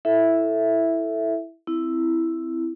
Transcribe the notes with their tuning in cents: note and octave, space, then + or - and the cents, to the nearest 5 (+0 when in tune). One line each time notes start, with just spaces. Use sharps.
E4 +0 A4 +0 E5 +0
C4 -10 E4 +0